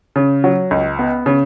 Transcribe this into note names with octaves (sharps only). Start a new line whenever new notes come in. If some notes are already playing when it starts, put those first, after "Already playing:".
C#3
F#3
C#2
B3
C#3